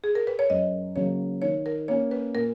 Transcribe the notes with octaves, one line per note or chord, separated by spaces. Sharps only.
G#4
A#4
B4
C#5
F#2 D#5
C#3 F#3 A#3 C#5
D#3 C#5
A#4
A#3 C#4 C#5
B4
A#2 A#4